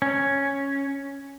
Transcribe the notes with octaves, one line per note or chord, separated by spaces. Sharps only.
C#4